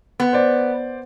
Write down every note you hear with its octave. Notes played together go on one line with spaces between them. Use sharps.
B3
C5 D5